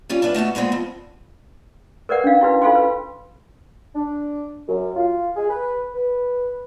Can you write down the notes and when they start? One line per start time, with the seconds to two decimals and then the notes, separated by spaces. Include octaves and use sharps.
0.09 G3 C#4 F4
0.22 D4 E4 F4 B4
0.34 B2 A3 B3 F#4
0.55 A#2 G#3 B3 C4
0.72 F2
2.09 A#4 B4 D5 F#5
2.24 C#4 D4 F5
2.41 E4 F#4 B4
2.62 F4 A4 F5 G5 C6
2.75 B4
3.95 D4
4.68 F#2
4.96 F4
5.36 G#4
5.49 B4
5.95 B4